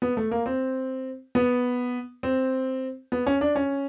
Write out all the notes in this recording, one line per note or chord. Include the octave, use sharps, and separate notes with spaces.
B3
A3
A#3
C4
B3
C4
B3
C#4
D4
C#4